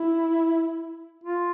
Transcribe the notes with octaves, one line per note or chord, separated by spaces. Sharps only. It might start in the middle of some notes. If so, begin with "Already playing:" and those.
Already playing: E4
F4